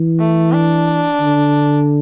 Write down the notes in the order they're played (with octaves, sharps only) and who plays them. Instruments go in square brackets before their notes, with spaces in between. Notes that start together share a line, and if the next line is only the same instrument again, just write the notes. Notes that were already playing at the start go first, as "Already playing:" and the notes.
Already playing: [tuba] E3
[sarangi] A3
D4
[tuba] D3